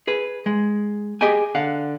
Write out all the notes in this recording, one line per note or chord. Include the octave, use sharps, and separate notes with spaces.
G#4 B4
G#3
G4 G#4 D#5 G5 G#5
D3 F5 F#5